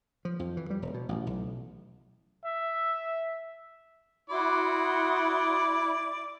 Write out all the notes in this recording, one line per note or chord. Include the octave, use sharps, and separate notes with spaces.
F3
F2
E3
G3
E1
B2
A1
B1
E5
E4 F#4 D5 C6 D#6